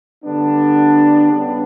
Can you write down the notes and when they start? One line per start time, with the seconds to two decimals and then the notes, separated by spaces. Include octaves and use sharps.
0.24 D3 G3 B3 D4
1.31 C#3 G3 B3